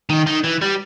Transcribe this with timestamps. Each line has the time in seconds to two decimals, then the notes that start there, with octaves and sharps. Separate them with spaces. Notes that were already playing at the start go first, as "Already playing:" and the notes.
0.09 D#3
0.27 D#3
0.44 E3
0.62 G3